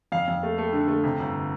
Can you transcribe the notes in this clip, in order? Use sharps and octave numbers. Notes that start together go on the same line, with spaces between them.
F2 F5
F2
A3
A3
D3
A3
C3
G1